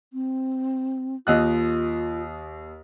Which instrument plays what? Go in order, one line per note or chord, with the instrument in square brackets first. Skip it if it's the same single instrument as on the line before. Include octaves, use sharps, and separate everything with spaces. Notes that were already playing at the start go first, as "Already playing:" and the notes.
[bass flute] C4
[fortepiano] D#2 D#5 F#6 [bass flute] F4